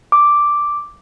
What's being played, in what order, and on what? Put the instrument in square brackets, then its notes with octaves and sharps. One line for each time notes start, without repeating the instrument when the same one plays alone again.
[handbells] D6